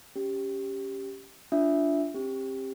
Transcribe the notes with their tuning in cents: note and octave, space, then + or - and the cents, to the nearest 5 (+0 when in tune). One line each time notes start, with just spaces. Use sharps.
C#4 +0 G4 +0
D4 -10 F4 -10 E5 +0
C4 +35 G4 +15